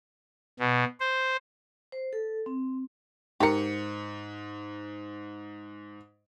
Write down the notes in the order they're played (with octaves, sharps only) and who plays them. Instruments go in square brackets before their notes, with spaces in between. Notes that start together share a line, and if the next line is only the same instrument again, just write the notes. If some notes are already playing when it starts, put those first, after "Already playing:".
[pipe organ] B2
C5
[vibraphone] C5
A4
C4
[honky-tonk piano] G#2 C#7 [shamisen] G4 A#4